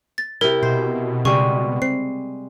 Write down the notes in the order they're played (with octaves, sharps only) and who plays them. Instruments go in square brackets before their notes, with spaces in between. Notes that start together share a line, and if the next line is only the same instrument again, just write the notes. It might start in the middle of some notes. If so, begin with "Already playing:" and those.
[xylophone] A6
[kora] C3 E4 [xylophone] A#4
[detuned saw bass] B2 [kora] C5
[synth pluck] C#3 [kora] G3 G#3 [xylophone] C#6
[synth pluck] C4 [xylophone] C7